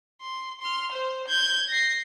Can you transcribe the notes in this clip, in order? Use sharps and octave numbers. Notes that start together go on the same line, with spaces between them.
C6
C6 F6
C5
G6 G#6
A#6 C7